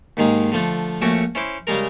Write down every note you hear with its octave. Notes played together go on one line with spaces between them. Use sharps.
D#2 G#2 D#3 G#3
D3 F3 A3
A#1 A3 C#4 F#4 E5 D6
C#4 E4 C5 D6
C#3 G3 G#3 A#4